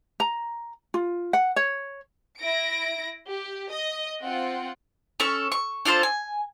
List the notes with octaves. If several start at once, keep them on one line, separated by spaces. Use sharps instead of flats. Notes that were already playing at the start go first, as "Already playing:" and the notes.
A#5
F4
F#5
C#5
E4 A#6 D7
G4
D#5 D#6
C4 F4 F#5 G5
C#4 A4 C#6
C#6
D4 F4 A4 C5
G#5